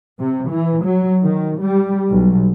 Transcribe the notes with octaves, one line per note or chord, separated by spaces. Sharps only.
C3
E3
F#3
D#3
G3
B1